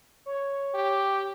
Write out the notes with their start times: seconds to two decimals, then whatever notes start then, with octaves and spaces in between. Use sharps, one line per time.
0.26 C#5
0.74 G4